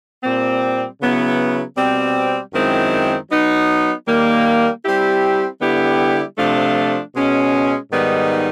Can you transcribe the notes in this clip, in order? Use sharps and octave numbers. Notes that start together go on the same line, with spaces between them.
A#2 G3 C4
C#3 F#3 B3 E4
B2 G3 C4
F#2 D#3 G#3 C4 E4
F#3 B3 D#4
D#3 G3 A#3
G3 C4 E4 G4
D3 G3 B3 E4 G4
C3 F3 A3 D4 F4
B2 G#3 C#4
G#2 D#3 G3 B3 D#4